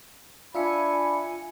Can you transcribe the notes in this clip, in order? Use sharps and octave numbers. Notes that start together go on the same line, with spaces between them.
D4 F4 E5 G#5 B5 C#7